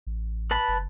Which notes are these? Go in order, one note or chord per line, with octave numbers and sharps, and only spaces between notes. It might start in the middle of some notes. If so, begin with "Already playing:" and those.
A1
B4 A5 B5
F#1